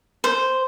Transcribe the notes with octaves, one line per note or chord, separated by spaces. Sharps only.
C5